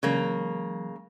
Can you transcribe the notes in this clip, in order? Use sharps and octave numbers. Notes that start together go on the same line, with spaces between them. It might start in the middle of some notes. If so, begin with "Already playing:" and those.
C#3 E3 F#3 G#3 A#3